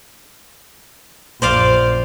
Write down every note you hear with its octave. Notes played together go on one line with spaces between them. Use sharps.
A#1 F#2 C5 D5 F5